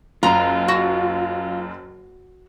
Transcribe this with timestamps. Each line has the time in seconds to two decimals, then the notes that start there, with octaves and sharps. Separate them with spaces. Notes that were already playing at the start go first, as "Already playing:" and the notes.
0.23 F#1 F#2 F4 A#5
0.68 F#4